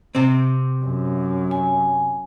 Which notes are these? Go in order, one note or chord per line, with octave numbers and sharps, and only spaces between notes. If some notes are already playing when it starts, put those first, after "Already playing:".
C3 C4
F#2
G#5